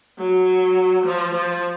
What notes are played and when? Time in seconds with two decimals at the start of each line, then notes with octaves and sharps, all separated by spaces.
0.19 F#3
1.05 F3
1.35 F3